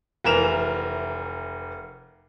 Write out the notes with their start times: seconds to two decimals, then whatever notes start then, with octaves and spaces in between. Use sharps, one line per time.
0.24 F1 E3 A#4 E7 F7